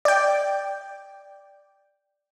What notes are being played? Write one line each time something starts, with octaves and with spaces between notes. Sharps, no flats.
D5 G5